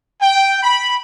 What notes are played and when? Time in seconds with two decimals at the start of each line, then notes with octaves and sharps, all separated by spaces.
0.21 G5
0.63 B5